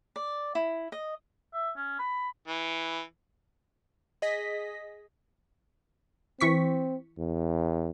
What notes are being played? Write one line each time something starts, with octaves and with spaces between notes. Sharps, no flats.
D5
E4
D#5
E5
C#4
B5
E3
G#4 D#5 A#6 B6
E3 C4 C#6 B6
E2